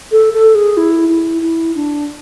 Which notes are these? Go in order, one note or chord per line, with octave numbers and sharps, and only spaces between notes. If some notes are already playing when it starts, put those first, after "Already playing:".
A4
A4
G#4
E4
E4
E4
D4